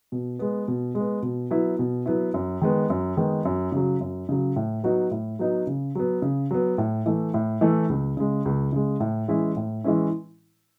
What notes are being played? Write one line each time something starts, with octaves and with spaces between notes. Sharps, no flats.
B2
G#3 B3
B2
G#3
B3
B2
F#3 B3 E4
B2
F#3 B3 E4
F#2
D#3 G#3 B3
F#2
D#3 G#3 B3
F#2
C#3 F#3
F#2
C#3 F#3
A2
F#3 B3 D#4 F#4
A2
F#3 B3 D#4 F#4
C#3
F#3 B3
C#3
F#3 B3
A2
E3 A3
A2
E3 A3
C#2
C#3 G#3
C#2
C#3 G#3
A2
E3 G#3 C#4 E4
A2
E3 G#3 C#4 E4